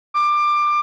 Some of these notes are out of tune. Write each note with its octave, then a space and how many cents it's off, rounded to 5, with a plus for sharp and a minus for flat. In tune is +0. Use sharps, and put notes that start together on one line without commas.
D6 +20